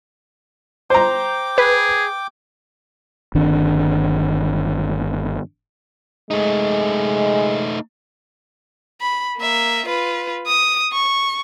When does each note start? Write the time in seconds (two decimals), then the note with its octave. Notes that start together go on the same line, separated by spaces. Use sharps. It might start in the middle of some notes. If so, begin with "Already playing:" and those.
0.90 C5 G5 A#5 D6
1.58 G#4 B4
3.35 G1 D#3 C4 D4
6.31 G#3 A3 D#4
9.00 B5
9.37 A#3 E5
9.86 F4 B4
10.47 D#6
10.93 C#6